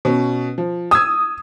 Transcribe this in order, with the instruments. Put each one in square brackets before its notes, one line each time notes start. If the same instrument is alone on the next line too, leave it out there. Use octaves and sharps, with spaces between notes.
[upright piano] B2 C#4
F3
[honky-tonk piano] D#6 [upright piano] E6 G#6